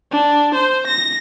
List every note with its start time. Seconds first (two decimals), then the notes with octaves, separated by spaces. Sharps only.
0.11 D4
0.55 C5
0.87 A#6